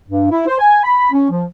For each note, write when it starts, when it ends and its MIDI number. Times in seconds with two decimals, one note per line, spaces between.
0.08 0.27 43
0.30 0.44 64
0.47 0.55 72
0.59 0.83 80
0.83 1.08 83
1.11 1.28 61
1.30 1.44 53